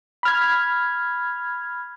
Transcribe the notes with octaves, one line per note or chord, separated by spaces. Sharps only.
B5 F6 G#6